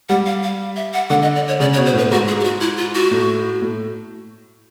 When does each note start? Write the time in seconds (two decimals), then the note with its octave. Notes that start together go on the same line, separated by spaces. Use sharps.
0.09 G3 F#5
0.26 F5
0.43 F5
0.76 E5
0.93 F#5
1.10 D3 F#5
1.22 D#5
1.35 D5
1.48 C#5
1.60 C#3 D5
1.73 C#5
1.77 B2
1.86 C5
1.93 A2 B4
2.11 G#2 F#4
2.28 G#4
2.40 G4
2.44 F#4
2.61 E4
2.78 F4
2.95 F#4
3.11 A2
3.62 A2